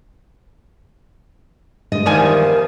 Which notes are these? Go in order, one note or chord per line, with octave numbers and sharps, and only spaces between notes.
G2 G#3 D#5
E2 G2 D#3 F3 A#4 D5 G#5